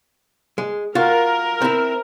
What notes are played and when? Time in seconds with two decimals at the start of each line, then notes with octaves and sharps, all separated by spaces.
0.58 G#3
0.95 F4 F#4 A#4
1.62 C4 E4